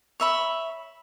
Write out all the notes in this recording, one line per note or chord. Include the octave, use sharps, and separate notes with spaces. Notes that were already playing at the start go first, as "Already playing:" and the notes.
C#5 E5 B5